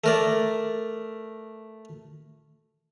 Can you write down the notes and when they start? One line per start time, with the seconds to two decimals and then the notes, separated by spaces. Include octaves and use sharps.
0.04 A3 A#4 D5